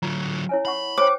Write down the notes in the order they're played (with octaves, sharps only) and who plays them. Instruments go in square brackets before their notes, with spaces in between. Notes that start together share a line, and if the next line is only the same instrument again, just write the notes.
[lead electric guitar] D3 F#3 [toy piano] F4 A#5
[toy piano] E4 C#5 G#5
[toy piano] E4 F#5 C#6 [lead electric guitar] B5
[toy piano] C5 C#5 G5 [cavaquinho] D6